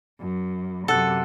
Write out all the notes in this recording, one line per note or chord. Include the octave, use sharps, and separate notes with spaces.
F#2
F#2 C3 A4 F#5 F#6